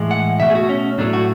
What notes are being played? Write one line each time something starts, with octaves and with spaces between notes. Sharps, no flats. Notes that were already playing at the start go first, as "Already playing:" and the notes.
Already playing: A2 E3 G#3
F#5
B2 A3 E5
G#4
F#4
C#4
A2 F#3 A3 D4
F#4